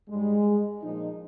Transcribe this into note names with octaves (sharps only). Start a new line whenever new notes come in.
G#2 G3 G#3
A#2 F3 D#4